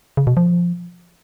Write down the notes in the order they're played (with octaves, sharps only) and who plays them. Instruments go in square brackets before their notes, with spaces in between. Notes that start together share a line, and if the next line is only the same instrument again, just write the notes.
[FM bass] C#3
B2
F3